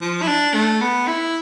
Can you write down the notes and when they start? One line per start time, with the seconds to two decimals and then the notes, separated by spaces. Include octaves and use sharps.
0.01 F3
0.22 E4
0.28 D4
0.54 A3
0.81 B3
1.08 E4